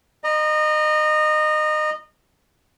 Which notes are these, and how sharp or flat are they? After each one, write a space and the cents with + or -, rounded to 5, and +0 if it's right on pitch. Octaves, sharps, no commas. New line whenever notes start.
D#5 -25 A#5 +20